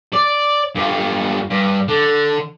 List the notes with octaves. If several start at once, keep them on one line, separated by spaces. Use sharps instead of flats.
D5
G2 F4
G2
D3